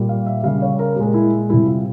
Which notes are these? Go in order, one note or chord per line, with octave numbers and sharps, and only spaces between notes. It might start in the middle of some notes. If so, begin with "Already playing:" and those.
Already playing: A#2 G3
F5
E5
C#3 G3 F5
C#5
A#4
A#2 G#3 G4
E4
C3 G3 E4
F4